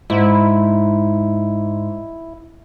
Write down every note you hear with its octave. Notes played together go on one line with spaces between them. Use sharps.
G#2 E4